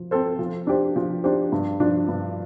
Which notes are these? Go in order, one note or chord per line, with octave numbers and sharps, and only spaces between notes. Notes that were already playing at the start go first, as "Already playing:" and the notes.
Already playing: F3
C4 A4 C5
F3
D4 G4 C5
F3
D4 G4 C5
G2
F3 D4
G2